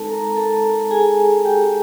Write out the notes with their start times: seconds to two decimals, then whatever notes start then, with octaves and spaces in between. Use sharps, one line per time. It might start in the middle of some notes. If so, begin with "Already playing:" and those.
Already playing: G#3 C4 D#4 A4 A5
0.09 A#4 A#5
0.36 A4 A5
0.91 G#4 G#5
1.45 G4 G5